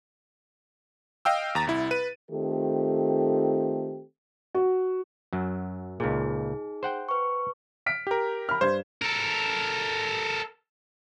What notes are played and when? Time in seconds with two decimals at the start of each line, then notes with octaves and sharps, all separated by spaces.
1.25 D#5 F5 G5 E6
1.55 D#2 A#5 A6
1.67 C2 E4
1.91 B4 D#7
2.30 D#3 A3 C4 F4 G4 A4
4.55 F#4
5.33 F#2 F#3
6.00 C#2 A#2 D#4 G#4
6.83 C5 F#5 G5
7.09 B4 C#6
7.86 F6 B6 D7
8.07 G4 A#4
8.49 B5 F6
8.61 G2 C5 G#6
9.02 A4 A#4